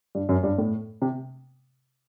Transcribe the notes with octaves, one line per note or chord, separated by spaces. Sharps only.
G2
F#2
G2
A2
C3